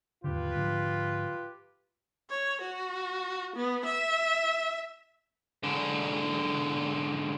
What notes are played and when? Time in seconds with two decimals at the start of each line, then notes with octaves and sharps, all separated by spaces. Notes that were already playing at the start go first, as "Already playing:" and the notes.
0.24 D#2 G#2 D3 F4 G4 B4
0.55 G#2 D3 F3
2.30 C#5
2.61 F#4
3.56 B3
3.85 E5
5.63 G#2 D3